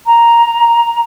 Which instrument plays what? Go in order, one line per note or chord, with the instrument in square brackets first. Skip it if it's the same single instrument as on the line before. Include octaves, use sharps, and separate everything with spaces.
[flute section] A#5